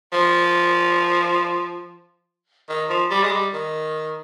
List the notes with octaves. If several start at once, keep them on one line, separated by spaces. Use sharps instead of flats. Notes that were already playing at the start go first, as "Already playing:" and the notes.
F3
D#3
F3
G3
G#3
G3
D#3